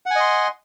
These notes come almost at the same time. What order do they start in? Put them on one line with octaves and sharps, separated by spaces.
F#5 G#5 D#5 C6